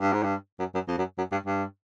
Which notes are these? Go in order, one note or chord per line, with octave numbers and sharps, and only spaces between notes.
G2
G#2
G2
F#2
F#2
F2
F#2
F#2
G2
G2